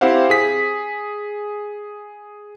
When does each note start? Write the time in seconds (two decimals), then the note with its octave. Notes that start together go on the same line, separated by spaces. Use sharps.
0.01 C4 E4 G4 C5 F5 F#5
0.30 G#4 B6